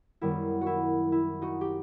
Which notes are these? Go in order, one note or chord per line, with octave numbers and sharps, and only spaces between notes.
F#2 D#3 G3 B3 E4
F#4
E4
E4
D#4 F#4
G4